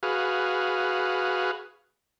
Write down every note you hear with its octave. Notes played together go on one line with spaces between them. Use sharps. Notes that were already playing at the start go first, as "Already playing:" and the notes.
F#4 G#4 B4 F5